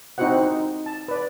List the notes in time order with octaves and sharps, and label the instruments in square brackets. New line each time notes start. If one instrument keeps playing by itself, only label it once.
[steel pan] C4 D#4 E4 F#4 C5 F#5
D#4
A5
B4 D5